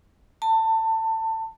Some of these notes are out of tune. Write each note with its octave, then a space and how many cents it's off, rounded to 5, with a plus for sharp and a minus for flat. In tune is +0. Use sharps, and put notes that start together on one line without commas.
A5 +25